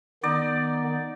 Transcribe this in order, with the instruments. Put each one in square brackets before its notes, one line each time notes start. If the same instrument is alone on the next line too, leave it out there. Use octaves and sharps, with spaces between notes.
[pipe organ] D#3 B3 [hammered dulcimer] D#4 D5